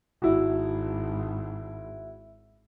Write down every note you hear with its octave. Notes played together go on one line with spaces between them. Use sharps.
G#1 E4 F#4